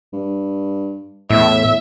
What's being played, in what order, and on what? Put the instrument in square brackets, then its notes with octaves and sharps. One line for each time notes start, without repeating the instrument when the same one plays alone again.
[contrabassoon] G2
[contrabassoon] E2 [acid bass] A2 [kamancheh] E5